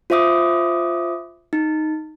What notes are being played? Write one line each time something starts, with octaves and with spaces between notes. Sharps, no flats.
F4 C5 E5 D6 D#6
D#4